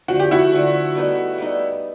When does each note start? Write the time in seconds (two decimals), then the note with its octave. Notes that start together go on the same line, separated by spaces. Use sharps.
0.08 D3 F3 A3 F#4
0.20 G4
0.31 E4 F#4
0.52 D3 F3 A3
0.95 G3 B3 D#4
1.38 G3 B3 D#4